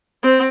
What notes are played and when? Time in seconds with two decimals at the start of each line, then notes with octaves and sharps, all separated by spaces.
0.23 C4